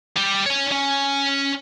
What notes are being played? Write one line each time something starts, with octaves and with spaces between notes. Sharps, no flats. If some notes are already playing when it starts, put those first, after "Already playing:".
G3 G4
C#5 G#5
C#4